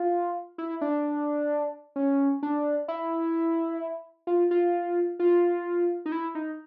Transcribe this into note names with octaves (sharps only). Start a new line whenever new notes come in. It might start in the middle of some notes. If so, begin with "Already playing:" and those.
Already playing: F4
E4
D4
C#4
D4
E4
F4
F4
F4
D#4
E4
D#4